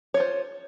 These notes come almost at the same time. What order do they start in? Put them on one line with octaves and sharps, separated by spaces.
C#5 F4 C5